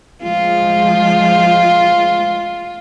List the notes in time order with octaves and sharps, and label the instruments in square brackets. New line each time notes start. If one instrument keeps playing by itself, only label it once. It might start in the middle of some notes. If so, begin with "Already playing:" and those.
[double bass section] F3 G#3 [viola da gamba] F4